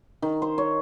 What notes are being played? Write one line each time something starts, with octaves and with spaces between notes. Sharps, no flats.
D#3
C5
C#5